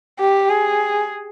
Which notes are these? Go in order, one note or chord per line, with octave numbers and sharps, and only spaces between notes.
G4
G#4